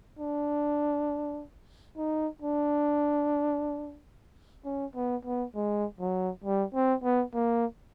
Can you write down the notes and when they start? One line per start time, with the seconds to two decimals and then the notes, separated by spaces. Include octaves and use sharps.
0.19 D4
1.97 D#4
2.42 D4
4.65 C#4
4.95 B3
5.25 B3
5.55 G#3
6.00 F#3
6.44 G3
6.74 C4
7.03 B3
7.34 A#3